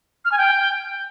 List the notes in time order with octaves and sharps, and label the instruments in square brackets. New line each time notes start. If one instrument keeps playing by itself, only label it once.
[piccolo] F6
G#5
G5